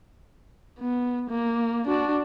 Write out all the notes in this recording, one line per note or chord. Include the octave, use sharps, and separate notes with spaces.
B3
A#3
D4 F#4